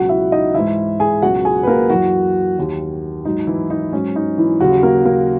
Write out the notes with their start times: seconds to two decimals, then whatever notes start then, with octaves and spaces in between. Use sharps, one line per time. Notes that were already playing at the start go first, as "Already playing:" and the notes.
Already playing: C#2 B2 F#3 F#4 F#5
0.09 E4 E5
0.32 D#4 D#5
0.54 G#2 E3 E4 E5
1.00 G#4 G#5
1.22 C#2 B2 F#3 F#4 F#5
1.45 G#4 G#5
1.63 B4
1.67 A#3 A#4
1.90 F#2 E3 F#3 F#4
2.57 D#2 D#3 F#3
3.25 G#2 F#3 D#4
3.47 E3 E4
3.70 D#4
3.92 G#2 F#3 C#4
4.16 D#4
4.37 E3 E4
4.60 D#2 C#3 F#3 F#4
4.83 A#3 A#4
5.05 A#3 A#4